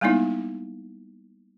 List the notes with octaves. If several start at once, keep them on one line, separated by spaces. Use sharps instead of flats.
G3 G#3 A#3 B3 D#4 E4